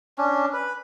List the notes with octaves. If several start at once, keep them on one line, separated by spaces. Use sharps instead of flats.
C#4 D4
B4